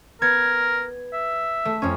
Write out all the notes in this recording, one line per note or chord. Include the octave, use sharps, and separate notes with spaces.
B3 A#4 G#6
E5
A3
F2 C#4